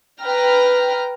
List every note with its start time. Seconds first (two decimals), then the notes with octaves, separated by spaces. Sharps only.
0.20 B4 G5 A#5 F6